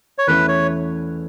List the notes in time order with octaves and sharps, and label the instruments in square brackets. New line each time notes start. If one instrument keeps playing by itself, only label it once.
[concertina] C#5
[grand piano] E2 E3 A3 C#4 E4 [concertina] B4
[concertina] C#5